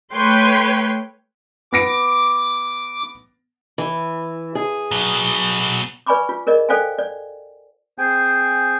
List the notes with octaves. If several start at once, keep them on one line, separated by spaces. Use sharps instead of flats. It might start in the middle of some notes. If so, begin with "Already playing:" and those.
A3 B4 C#5 G5 C6
B3 D6 A#6 D7
E3
G#4
B2 F#3
B4 D5 G#5 B5 C#6 D6
F4
G#4 A#4 D5 D#5
A4 C5 D5 F5 G5 G#5
D5
C4 G#4 C5 G5 G#5